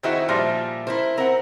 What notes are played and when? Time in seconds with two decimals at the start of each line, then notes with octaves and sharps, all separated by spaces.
0.03 D#3 C4 D#4 E4 F#4 G#4
0.29 A#2 F3 G3 E5 C6 F6 A#6
0.87 E4 A#4 C5
1.17 C4 A#4 C5 F#5 A#5